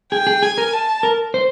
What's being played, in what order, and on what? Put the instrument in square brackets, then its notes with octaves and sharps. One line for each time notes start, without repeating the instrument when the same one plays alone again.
[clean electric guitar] G#4 [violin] G5
[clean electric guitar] G#4
[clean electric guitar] G#4 [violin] G#5
[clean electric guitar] A#4
[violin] A5
[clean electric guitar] A#4
C5